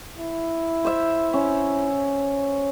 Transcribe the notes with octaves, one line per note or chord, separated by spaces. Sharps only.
E4
C5 E5
C#4